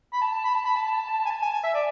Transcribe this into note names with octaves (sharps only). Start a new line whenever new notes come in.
B5
A5
A5
B5
A5
B5
A5
A5
A5
A5
A5
G#5
A5
G#5
G#5
E5
D5